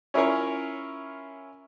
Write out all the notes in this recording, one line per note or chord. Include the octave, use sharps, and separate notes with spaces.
C#4 E4 F4 A#4 C#5